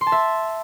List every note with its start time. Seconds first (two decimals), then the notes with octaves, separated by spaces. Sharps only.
0.01 C6
0.07 A5
0.12 E5